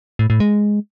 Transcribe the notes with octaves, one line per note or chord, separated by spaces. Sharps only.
A2
A2
G#3